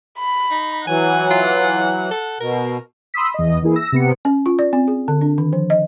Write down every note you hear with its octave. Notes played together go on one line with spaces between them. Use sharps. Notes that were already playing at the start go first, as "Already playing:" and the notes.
B5
D#4
E3 F#3 F#5 G#5
F4
A4
B2 A#4
B5 C6 D#6 E6 B6
E2 D#5
E3 A#3 E4 G#4
E6 A#6
C3 B3 C#7
C#4
F4
D5
C4
G#4
D3
D4
D#3
F3
D#5